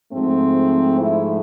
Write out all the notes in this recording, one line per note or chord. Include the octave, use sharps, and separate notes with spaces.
G#2 F3 A3 C4
E4